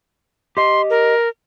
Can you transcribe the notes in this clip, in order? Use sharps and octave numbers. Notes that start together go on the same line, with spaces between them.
G4 D#5 C6
A#4